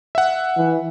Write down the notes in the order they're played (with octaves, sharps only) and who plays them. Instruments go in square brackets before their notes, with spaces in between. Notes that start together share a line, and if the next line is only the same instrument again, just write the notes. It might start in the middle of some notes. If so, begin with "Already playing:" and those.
[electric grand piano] E5 F#5
[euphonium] E3